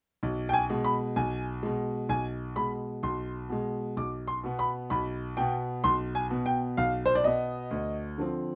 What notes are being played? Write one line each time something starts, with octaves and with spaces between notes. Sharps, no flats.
B1
G5
G#5
B2 G#3
B5
B1 G#5
B2 G#3
B1 G#5
B2 G#3 B5
B1 C6
B2 G#3
B1 D6
C6
B2 B3
B5
B1 B5
B2 B3 G5
B1 C6
G#5
B2 B3
G5
B1 F5
C5
D5
B2 B3 D#5
D2
D3 F3 C4